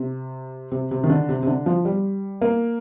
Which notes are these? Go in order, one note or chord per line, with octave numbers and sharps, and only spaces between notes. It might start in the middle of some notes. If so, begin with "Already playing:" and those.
Already playing: C3
C3
C3
D#3
D3
C3
C3
D3
F3
G3
A#3